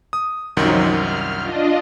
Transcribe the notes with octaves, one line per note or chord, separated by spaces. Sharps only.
D#6
C2 F#2 D#3 F3 F#3 D#4
F6
D4 F4 D#5